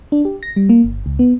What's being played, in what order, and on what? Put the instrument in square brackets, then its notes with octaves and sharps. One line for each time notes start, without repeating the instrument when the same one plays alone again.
[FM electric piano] D4
G4
A#6
G3
A#3
G1
C#2
B3